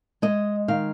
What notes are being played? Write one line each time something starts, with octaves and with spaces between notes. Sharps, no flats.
G#3 D#5
D#3 F5